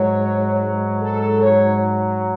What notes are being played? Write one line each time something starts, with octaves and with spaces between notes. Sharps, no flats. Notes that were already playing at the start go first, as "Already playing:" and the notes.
Already playing: G#2 F#3 C#5
A4
C#5